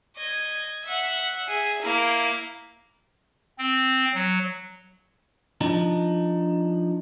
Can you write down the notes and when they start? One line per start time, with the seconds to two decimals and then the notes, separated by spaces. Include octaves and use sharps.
0.17 D#5 G#6
0.84 E5 F#5
1.47 G#4 E5
1.82 A#3 E4
3.58 C4
4.14 F#3
5.61 F3 D4 D#4